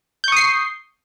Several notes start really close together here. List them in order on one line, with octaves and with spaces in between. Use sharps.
G6 C#6 D#6 C7